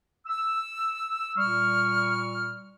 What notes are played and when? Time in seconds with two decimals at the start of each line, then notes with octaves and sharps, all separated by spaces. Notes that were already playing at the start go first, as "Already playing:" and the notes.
0.27 E6
1.37 A#2 G3 C#6 F6